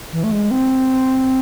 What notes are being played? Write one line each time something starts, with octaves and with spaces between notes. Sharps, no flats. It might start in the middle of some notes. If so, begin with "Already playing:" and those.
E3
A3
G#3
C4